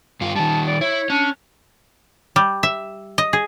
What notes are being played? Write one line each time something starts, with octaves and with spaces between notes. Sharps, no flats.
G2 F4
D#3 G3 A5
D5
E4 C#5
C#4 D4
G3
E5
D#5
G#4